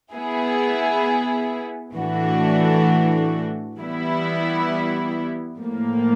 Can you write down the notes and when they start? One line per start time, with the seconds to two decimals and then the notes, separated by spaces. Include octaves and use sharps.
0.14 B3 E4 G#4
1.95 A2 E3 A3 D4 F#4
3.77 E3 G3 B3 E4
5.59 A2 F3 A#3